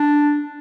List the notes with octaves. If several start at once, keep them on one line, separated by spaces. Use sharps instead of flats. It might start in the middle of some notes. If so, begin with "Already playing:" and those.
Already playing: D4